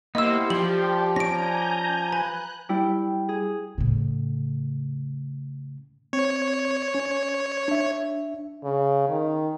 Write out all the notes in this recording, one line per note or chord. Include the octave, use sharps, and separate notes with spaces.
A#3 B3 E4 G4 C5 D#5 E6
F3 D5 G5 C6 F#7
C#4 D5 G#5 A#5 G6 A#6 D7
B4 G#5 F#6
G3 E4 G5 G6
G#4
A2 C#3
C4 C#5
C#4
D4 E5
C#3
D#3